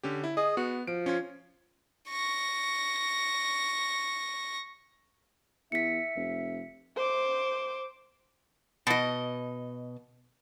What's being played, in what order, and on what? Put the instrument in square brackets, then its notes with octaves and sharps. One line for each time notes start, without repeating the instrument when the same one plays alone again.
[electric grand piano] D3 C#4 G4
E4
[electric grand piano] G#4 [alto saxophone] D#5
[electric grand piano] B3 [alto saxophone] F#4
[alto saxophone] F3 [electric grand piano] D7
[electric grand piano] C#4 F4 G#6
[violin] C#6 A#6
[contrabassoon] E2 [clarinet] E5 [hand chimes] B6 C#7
[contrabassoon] F1
[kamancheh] C5 D6
[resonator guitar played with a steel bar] B2 D#5